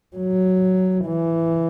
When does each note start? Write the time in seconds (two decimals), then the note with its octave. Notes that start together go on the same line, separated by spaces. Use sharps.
0.16 F#3
1.06 E3